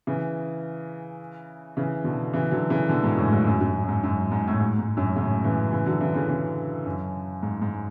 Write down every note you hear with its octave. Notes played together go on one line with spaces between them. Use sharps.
C#3 E3
C#3 E3
B2 D3
C#3 E3
D3 F#3
C#3 E3
B2 D3
G#2 B2
F#2 A2
G#2
F#2
F#2
F#2
G#2
F#2
G#2
A2
G#2
G#2
F#2 A2
A2 C#3
C#3 E3
C#3 E3
D3 F#3
C#3 E3
C#3 E3
C#3 E3
F#2
G#2
G#2